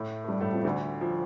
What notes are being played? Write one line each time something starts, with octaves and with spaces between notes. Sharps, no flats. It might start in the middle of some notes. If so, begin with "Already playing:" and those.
Already playing: A2 A3
A3
G2 G3
A2 A3
F2 F3
D2 D3
F3